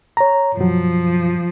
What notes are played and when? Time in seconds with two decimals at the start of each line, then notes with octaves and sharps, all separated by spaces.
0.17 C#5 A#5
0.57 F#2 B2 F3 F#3